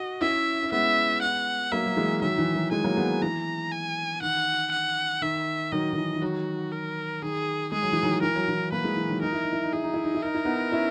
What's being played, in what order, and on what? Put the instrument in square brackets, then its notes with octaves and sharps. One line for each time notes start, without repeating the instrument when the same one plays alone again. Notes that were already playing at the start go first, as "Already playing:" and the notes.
Already playing: [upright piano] F#4 [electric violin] D#5
[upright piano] C#4 E4 [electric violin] E5
[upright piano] C#4
[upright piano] G#3 B3 [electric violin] E5
[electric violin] F#5
[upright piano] F#3 A#3 [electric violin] E5
[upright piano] F#3
E3 G#3
[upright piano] D#3 F#3 [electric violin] E5
[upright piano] E3
D#3 F#3
[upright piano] E3 G#3 [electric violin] G#5
[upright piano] F#3 A#3
G#3 B3
[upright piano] E3 [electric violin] A#5
[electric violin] G#5
[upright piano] D#3 [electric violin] F#5
[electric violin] F#5
[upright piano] D#3 [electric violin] E5
[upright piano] D#3 F#3 [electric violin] D#5
[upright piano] D#3
E3
E3
[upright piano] D#3 F#3 [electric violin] F#4
[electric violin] A#4
[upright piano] D#3 [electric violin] G#4
[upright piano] G#3 [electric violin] G#4
[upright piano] F#3
E3
D#3 F#3
[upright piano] E3 [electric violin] A#4
[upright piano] F#3
E3
[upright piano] F#3 A#3 [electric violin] B4
[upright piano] E3 G#3
E3
D#3 F#3
[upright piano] D#4 [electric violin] A#4
[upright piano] E4
D#4
E4
D#4
[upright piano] E4 [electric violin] G#4
[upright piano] D#4
E4
D#4
E4
[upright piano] D#4 [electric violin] A#4
[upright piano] E4
B3 D#4
C#4 E4